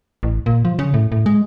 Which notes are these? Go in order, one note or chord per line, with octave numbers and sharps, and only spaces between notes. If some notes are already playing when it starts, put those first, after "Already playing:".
A1
A#2
F3
C#3
A2
A2
G#3